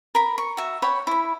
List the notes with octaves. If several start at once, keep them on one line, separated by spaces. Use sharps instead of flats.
A#4 B5
C#6
F#4 E5
C#5 F#5 G5 B5
E4 B5